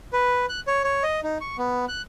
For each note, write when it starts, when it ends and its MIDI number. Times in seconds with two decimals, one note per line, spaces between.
0.13 0.46 71
0.49 0.60 90
0.67 0.83 73
0.84 1.03 73
1.03 1.20 75
1.23 1.38 63
1.41 1.57 85
1.58 1.85 59
1.88 2.02 90